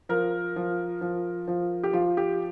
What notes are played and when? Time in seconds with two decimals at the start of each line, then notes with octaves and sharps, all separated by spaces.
0.09 F3 A#4
0.56 F3
1.01 F3
1.47 F3
1.83 G4
1.93 F3 F4
2.17 G4